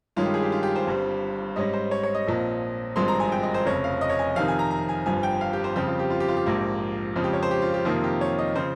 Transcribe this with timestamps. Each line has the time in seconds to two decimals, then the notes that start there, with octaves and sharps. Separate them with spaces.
0.16 G2 D#3 G#3 C#4 F4
0.26 G4
0.34 G#4
0.42 G4
0.52 F4
0.63 G4
0.76 C5
0.87 G1 G2 G3 C4
1.56 G#2 G3 C#4 D#5
1.73 C5
1.91 C#5
2.03 C#5
2.15 D#5
2.27 A#1 A#2 F3 C4
2.96 G#1 G2 F3 G#3 C4 C6
3.08 A#5
3.20 G#5
3.32 G5
3.43 D#5
3.54 C5
3.66 F1 F2 C#3 C#5
3.84 F5
4.01 D#5
4.10 C#5
4.19 G#5
4.36 F2 C3 D#3 F5
4.48 G#5
4.59 A#5
4.71 A#5
4.89 G#5
5.06 G1 G2 F3 G#5
5.23 G5
5.41 F5
5.53 G4
5.64 C5
5.76 F2 C#3 G3 C4 G4
5.88 F4
5.99 G4
6.10 F4
6.20 G4
6.28 F4
6.37 G4
6.46 A#1 G#2 F3 A#3
7.16 F2 C#3 G#3 C4 F4
7.24 G4
7.33 C#5
7.43 C5
7.51 G4
7.62 F4
7.74 G4
7.85 F2 C3 D#3 A#3 F4
8.04 G4
8.21 C#5
8.39 D#5
8.56 C#3 F3 C4 C5